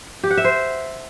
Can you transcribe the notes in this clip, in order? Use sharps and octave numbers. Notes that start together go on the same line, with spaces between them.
G4
F#5
E5
C5